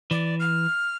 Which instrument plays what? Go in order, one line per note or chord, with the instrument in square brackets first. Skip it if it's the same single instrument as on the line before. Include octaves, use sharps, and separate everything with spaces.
[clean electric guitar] E3 [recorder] D5
[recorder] F6